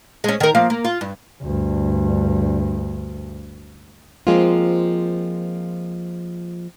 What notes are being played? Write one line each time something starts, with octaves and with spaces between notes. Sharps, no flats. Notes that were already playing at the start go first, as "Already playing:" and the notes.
G#3 C#4
D#3 A#4
F3 A#3 F5
A#3
F4
G2
D2 G2
F3 G#3 A#3 C4 F4